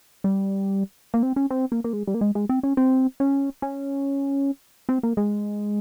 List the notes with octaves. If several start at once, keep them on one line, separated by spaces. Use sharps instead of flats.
G3
A#3
C4
C#4
C4
A#3
A#3
G#3
G3
A#3
G#3
G#3
C4
C#4
C4
C#4
C#4
C4
A#3
G#3